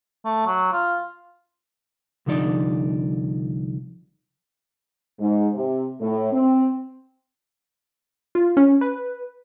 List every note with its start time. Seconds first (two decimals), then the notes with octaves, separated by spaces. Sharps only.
0.25 A3
0.47 F#3
0.72 F4
2.26 C2 D3 F3 D#4 D5
5.20 G#2
5.55 C3
6.01 A2
6.32 C4
8.35 F4
8.57 C#4
8.81 B4